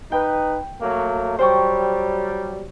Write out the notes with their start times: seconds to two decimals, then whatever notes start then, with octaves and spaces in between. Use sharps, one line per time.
0.12 D#4 B4 G5
0.81 F#3 A3 A#3
1.39 F#3 G3 C5 G5 C#6